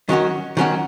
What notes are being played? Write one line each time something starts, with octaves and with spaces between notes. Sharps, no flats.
D#3 F#3 C#4 F#4
D#3 F#3 C#4 F#4